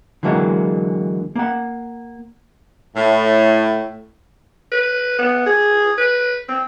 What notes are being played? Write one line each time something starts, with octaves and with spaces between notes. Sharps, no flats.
D3 E3 F#3 G#3 A#3
A#3 F#5
A2
B4
B3
G#4
B4
C4